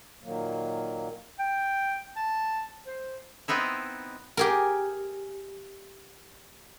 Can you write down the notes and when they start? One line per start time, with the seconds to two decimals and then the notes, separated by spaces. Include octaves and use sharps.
0.23 A#2 D#3 F#3 A#3
1.39 G5
2.16 A5
2.86 C5
3.48 B3 C4 D#4 E4
4.37 G4 G#4 A#4